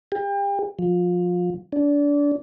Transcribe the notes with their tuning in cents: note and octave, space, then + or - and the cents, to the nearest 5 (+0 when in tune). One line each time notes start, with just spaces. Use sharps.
G4 +35
F3 +25
D4 -25